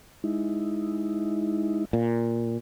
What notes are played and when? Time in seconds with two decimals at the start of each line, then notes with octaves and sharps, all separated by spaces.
0.24 G#3 D#4 E4
1.93 A#2